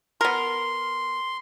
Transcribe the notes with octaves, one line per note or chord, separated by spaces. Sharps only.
B3 A#4 C6